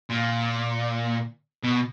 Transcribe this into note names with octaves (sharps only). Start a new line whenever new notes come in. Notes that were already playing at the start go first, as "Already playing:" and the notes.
A#2
B2